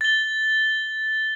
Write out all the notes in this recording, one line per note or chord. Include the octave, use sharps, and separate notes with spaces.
A6 G7